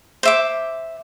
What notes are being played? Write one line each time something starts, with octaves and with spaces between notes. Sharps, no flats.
C5 E5 D6